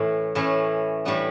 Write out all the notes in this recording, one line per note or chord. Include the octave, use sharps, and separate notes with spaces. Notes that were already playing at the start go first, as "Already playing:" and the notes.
Already playing: A2 E3 A3 C#4 E4
A2 E3 A3 C#4 E4
A2 E3 G3 B3 D4